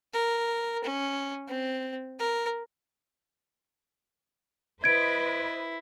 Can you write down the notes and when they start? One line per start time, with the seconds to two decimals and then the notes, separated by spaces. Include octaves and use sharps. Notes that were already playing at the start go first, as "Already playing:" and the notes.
0.14 A#4
0.84 C#4
1.48 C4
2.19 A#4
4.84 E4 B4 C5 D#5 G#6 D7